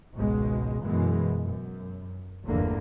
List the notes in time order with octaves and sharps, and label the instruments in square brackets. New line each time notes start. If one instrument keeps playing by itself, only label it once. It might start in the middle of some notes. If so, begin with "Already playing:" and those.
[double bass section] G#1 C#2 B2 G#3
F#2 B2 E3 G#3
F#2
G1 E2 A2 D3 A#3